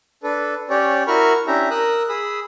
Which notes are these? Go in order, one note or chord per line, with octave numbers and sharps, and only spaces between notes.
D4 A4 B4
C#4 G4 C#5 D5
E4 F#4 A#4 B5 C#6 F6
C#4 D4 E4 G4 E5 A#5
A#4 D#6 E6 F#6
G#4 B5 D#6 E6